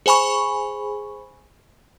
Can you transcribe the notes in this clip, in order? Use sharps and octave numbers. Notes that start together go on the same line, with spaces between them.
G#4 C5 G#5 B5 C#6